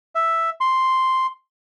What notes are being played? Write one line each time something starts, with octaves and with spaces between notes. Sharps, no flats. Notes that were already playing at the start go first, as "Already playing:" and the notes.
E5
C6